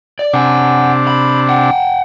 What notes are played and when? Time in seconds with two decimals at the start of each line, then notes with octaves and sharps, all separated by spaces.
0.19 D5
0.33 C3 D4 F#5 G#5
1.07 B5
1.49 F#5 G5